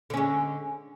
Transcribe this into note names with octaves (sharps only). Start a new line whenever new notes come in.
D3 G#3 C#4